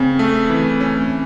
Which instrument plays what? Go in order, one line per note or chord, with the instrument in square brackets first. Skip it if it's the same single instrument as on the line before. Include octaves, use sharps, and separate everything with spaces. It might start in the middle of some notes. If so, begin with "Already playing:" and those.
Already playing: [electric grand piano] C#3 [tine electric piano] C4
[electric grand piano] A3
E3
C#4